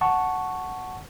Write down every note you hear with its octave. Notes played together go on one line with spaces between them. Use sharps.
F#5 A5 C#6